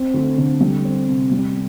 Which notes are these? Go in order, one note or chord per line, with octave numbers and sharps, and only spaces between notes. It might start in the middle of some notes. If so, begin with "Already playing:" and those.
Already playing: C4
D2
D3
G3
C4
C3
G3